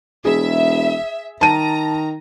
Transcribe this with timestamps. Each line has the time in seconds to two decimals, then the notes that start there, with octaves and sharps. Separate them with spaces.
0.25 E1 G#4 E5
1.41 D#3 A5 A#5 D#7